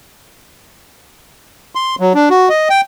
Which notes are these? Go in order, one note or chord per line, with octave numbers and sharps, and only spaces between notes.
C6
F#3
D4
F#4
D#5
G5